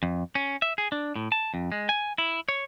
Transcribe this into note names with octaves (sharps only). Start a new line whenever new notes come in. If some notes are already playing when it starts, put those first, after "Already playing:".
F2
C#4
E5
G#4
D4
A2
A5
F2
G#3
G#5
E4
C#5